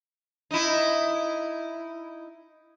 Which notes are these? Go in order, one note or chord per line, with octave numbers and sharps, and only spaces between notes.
D#4 E4